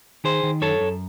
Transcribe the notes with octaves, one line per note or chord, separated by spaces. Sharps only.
D#3 G#4 C5
D#3
F#2 A4 C#5
F#2